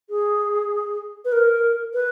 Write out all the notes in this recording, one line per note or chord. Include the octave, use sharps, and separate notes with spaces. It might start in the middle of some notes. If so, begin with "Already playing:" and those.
G#4
B4
A#4
B4